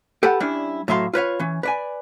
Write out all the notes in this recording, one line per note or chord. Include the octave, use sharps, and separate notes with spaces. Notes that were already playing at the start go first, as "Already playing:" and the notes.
G4 A4 B4 F#5
G3 C#4 D4 E4
A2 F#3 E5 F5 C6
F4 B4 C#5 F5
E3 C#4
B4 D5 G#5